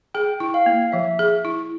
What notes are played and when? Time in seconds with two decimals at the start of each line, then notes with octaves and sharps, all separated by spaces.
0.14 G#4 G5
0.40 E4
0.54 F5
0.66 A#3
0.92 F3 E5
1.19 G#4
1.45 E4